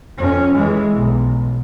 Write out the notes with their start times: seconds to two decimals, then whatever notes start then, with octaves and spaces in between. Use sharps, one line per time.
0.18 F2 C#4
0.54 E3 G#3
0.93 B1